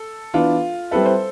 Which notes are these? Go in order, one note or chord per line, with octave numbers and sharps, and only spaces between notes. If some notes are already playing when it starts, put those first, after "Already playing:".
Already playing: A4
E3 B3 D4 F4
G3 C4 E4 A4 B4 E5
C5